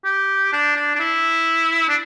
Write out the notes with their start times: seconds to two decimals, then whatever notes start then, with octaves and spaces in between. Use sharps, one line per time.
0.05 G4
0.52 D4
0.76 D4
0.95 D4
1.00 E4
1.88 D4